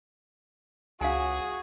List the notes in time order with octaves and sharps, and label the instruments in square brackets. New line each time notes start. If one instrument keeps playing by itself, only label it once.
[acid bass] C#2 [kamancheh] F#4 [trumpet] G#4 [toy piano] F5 G#5